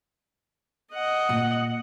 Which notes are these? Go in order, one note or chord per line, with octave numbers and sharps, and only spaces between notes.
D#5 F#5
A#2 A#3